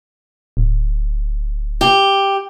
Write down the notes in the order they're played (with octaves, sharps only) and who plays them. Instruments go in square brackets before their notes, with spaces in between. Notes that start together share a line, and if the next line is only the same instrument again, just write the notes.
[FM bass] D1
[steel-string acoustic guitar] G4